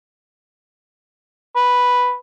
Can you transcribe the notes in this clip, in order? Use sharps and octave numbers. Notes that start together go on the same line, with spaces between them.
B4